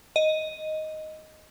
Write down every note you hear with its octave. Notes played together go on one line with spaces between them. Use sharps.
D#5